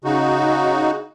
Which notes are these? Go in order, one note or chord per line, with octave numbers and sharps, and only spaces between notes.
C#3 D#4 F#4